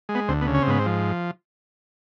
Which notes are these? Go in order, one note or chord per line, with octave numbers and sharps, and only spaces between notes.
G#3
B3
D2 C4
B3
C#3
C#4
C4
G#2 B3
C4
F3